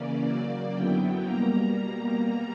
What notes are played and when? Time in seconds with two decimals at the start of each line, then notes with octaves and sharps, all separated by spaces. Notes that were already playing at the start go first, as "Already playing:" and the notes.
Already playing: C#3 E3 A#3 C#4 D5
0.24 C#3 F#3 A#3 D5
0.74 F#2 D3 F#3 B3 E4 G5
1.24 B2 G3 A#3 A#5